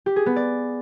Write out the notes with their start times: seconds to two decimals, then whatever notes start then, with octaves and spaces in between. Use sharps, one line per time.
0.06 G4
0.16 G#4
0.26 B3
0.36 D5